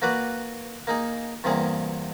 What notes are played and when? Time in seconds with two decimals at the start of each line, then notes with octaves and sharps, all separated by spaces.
0.02 A#3 F#4 B4 D5
0.87 A#3 D#4 G#4
1.44 E2 G2 C3 A#3 G#4